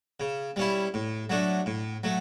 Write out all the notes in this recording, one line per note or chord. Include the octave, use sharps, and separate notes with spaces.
C#3
G3 C#4 E4
A2
F#3 A3 D4
A2
F#3 A3